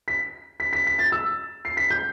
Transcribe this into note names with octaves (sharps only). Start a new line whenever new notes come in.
B6
B6
B6
B6
A6
E6
C7
B6
G6